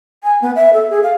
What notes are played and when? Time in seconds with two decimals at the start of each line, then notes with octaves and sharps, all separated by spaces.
0.24 G#5
0.42 B3
0.56 E5
0.73 A4
0.90 G#4
1.03 F5